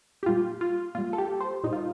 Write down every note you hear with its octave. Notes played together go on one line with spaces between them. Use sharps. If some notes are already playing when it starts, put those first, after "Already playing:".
G4
A#2 G3 F4
F4
A#2 G3 F4
A4
G4
C5
A#2 G3 D#4
F4